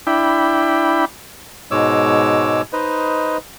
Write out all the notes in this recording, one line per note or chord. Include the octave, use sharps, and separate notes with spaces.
D4 E4 G5 B5
G#2 B2 G#3 C#5 D6 E6
D#4 B4 C5 D#5